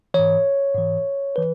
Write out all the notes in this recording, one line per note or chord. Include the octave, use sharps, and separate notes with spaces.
G#2 E3 C#5
G#2 E3
E3 B4